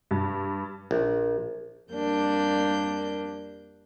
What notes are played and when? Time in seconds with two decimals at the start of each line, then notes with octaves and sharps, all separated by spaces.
0.11 G2
0.91 A#1
1.92 F2 G3 A#3 D4 G6